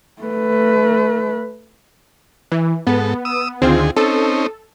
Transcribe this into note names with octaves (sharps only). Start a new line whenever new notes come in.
A3 B4
E3
G#2 B3 A4
D#6 E6
D2 D#3 C4 F4 G#4
C4 C#4 D#4 A4